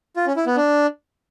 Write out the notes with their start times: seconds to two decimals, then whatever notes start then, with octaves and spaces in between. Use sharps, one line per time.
0.17 F4
0.26 C#4
0.36 E4
0.46 B3
0.56 D4